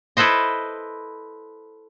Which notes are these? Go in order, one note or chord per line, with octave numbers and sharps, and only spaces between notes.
E4 A4 B4 C5 D#5